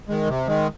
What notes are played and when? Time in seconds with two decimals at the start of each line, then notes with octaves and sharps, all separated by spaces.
0.09 D#3 G#3
0.28 C3
0.48 D#3 G#3